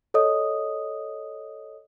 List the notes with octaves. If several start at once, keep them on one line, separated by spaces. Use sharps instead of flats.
A4 C#5 D#5 D#6